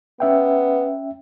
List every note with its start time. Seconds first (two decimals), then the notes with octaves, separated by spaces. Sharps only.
0.20 B3 C#4 E5 G5